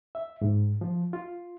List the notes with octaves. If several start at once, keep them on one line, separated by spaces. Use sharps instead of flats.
E5
G#2
F3
F4